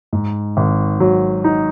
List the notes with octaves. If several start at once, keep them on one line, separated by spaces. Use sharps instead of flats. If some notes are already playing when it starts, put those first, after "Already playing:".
G#2
G#1
F#3
D#4